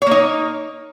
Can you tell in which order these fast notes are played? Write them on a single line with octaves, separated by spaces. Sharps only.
C#5 A#3 D#4